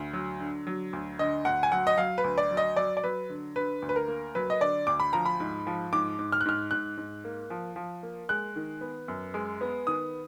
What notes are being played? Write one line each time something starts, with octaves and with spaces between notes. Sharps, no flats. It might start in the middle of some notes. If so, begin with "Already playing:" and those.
Already playing: D2
F#3
D3
F#3
D2
D3 D#5
D2 F#5
G#5
F#3 F#5
D#5
F#3 F5
B4
D2
D5
F#3
D#5
F#3 D5
D5
F#3 B4
D3
D3 B4
D2
B4
A#4
A#3
F#3 B4
D#5
D3 D5
D2 D6
B5
F3 A#5
B5
G#2
F3
G#2 D6
G#2
F6
F#6
G#2 F6
G#2 F#6
G#2
A#3
F3
F3
A#3
G#3 F#6
D#3
B3
F#2
G#3
B3
D#3 D#6